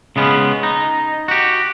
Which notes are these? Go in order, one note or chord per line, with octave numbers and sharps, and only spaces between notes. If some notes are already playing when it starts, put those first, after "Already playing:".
C#3 G#3 B3 C#4
D#4
F#4 G4